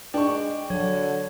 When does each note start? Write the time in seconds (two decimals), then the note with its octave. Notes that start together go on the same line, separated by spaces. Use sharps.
0.14 G#3 D4 G5 C#6
0.70 D3 F#3 C#5